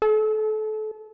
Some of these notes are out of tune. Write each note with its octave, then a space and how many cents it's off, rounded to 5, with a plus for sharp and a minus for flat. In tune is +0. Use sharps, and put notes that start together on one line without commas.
A4 -30